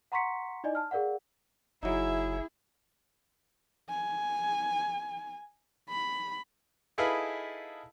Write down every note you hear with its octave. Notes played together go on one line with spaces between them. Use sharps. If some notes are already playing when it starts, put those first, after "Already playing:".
F#5 A#5 C6 C#6 B6 C#7
D#4 E4 D5 D#5 G#5
A5 F6
G#4 A#4 D5 F5 F#5
F#1 F#3 D#4 E4 G#4 E5
G#5
B5
D#4 E4 G#4 A4 B4 F5